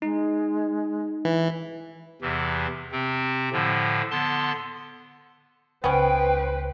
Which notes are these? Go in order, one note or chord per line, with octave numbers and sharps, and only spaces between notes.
G#3 D#4
E3
E2 C3 E3
C3 C4
A2 D3 F3
D3 B3 A5 C6
C#2 B3 C#4 B4 C5 G5